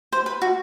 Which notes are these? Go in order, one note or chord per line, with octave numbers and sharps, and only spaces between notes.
C5
B4
F#4